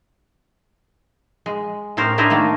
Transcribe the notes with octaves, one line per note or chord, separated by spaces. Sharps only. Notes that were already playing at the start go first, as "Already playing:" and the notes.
G#3
A2 C#4 A#4 C5
D4 E4 A#4 C5 D#5 E5
D#3 A3 A#3 D4